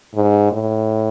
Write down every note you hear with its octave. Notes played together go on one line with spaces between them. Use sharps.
G#2
A2